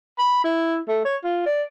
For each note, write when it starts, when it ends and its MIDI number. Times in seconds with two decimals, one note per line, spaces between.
0.18 0.42 83
0.44 0.77 64
0.88 1.03 57
1.05 1.16 73
1.24 1.44 65
1.46 1.63 74